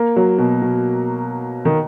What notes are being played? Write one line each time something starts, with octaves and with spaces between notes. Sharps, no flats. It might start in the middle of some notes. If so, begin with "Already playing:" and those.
Already playing: A#3
F#3
B2
B2
D#3